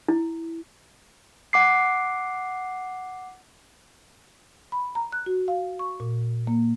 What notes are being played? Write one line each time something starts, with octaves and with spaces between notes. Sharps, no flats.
E4
F#5 D6 C7
B5
A#5
F#6
F#4
F5
C#6
A#2
A#3